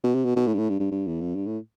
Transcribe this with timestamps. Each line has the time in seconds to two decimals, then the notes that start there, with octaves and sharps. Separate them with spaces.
0.04 B2
0.15 C3
0.25 B2
0.36 B2
0.47 A2
0.54 G2
0.58 A2
0.69 G2
0.80 G2
0.91 G2
1.07 E2
1.21 F2
1.35 G2
1.46 A2